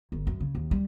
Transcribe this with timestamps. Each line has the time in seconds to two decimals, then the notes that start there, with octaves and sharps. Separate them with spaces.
0.12 G1
0.27 F#2
0.40 C#3
0.55 D#2
0.71 G3